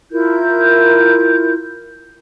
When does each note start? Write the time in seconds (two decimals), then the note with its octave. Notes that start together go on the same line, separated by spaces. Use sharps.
0.11 E4 F4 A#4 G6